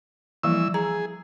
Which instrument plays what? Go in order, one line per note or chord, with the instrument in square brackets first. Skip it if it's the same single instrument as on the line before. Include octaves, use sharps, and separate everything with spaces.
[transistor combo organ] E3 E6 [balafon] F3 G3 A#3
[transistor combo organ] G#4 [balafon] A#5